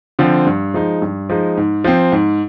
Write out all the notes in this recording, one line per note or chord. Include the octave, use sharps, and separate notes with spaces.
D3 F3 C4
G2
F3 G#3 D#4
G2
F3 G#3 D#4
G#2
F3 C4
G#2